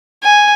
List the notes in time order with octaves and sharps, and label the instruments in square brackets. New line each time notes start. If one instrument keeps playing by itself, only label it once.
[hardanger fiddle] G#5